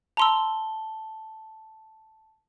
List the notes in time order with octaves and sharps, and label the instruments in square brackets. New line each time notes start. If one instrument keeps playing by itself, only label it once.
[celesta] A5 G7 [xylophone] A#5 C6 E6